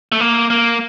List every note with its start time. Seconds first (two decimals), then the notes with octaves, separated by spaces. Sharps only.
0.12 A3
0.20 A#3
0.50 A#3